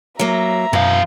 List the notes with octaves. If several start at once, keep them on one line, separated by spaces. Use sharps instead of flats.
F#3 A#3 E5 A#5
F#2 B2 E3 F5